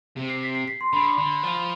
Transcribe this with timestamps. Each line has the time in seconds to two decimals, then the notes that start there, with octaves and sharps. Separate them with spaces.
0.17 C3
0.30 C7
0.43 B6
0.55 C7
0.68 B6
0.81 C6
0.93 D3 B5
1.18 D3
1.43 F3